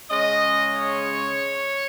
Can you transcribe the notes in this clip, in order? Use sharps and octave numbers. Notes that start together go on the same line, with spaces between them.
C#3 G#3 C#4 D#5
C#5